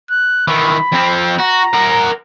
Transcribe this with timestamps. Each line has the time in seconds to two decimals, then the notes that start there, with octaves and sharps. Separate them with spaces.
0.10 F#6
0.48 D#3 E3 B5
0.92 F2 C4
1.39 F#4 A#5
1.73 A#4 F#5